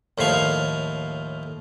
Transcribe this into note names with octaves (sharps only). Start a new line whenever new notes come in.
D#2 A2 F3 F5 G#5